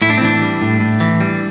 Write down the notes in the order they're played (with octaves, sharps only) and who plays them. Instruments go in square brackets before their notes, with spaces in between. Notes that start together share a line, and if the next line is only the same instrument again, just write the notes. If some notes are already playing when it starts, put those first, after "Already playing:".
[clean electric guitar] A2 E4
D4
C4
E3 D4
G3
A2
A2
E3
G3